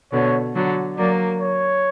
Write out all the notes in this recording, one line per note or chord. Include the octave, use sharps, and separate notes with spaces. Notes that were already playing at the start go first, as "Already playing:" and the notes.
B2 D3 C#5
D3 F#3
F#3 A#3 D5
C#5